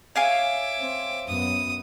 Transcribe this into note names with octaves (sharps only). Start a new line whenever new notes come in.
C#5 E5 F5 G#5 D6
C4
F#2 B3 D#6